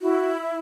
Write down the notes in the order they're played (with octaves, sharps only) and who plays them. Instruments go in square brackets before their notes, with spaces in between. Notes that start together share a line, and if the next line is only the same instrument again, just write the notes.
[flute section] E4 [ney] F#4